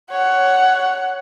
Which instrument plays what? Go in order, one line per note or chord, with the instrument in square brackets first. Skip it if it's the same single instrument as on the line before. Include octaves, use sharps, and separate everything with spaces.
[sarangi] C#5 [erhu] F#5